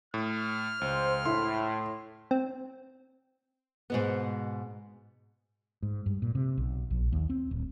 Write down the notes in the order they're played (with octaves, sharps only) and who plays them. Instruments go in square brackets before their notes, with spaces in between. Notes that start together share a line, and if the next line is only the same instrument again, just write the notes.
[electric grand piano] A2 [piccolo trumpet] F6
[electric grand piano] C#2 [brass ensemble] C5
[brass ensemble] A2 [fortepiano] E4 [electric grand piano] C6
[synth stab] C4
[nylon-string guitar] G#2 B2 B3
[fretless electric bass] G#2
G2
A#2
C3
B1
A#1
D#2
C4
D1